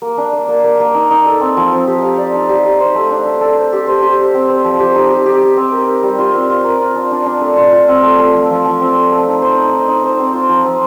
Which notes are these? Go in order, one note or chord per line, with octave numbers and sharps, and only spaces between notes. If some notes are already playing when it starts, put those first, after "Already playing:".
A#3
D4
A#3
A#3
A#3
A#3
D#4
D#4
A4
C4
F3
C4
G4
F5
D5
D#4
G4
D#4
C5
A3
D4
A3
A4
C5
G4
C5
G4
G4
C4
C5
F3
G4
D#4
G4
G4
G4
C4
A#4
A#4
G3
F4
C4
F4
A#4
F4
D4
D4
D4
A3
F4
F4
C4
A3
A3
F3
F3
F3
C4
A3
A3
D#4
C5
D#4
D#4
D#4
C5
C4
F4
F3
C4